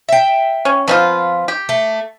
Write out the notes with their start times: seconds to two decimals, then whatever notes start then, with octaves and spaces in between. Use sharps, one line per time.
0.09 E5 G5
0.65 C#4
0.88 F3 B3 C4 F4 B4
1.48 G4
1.69 A3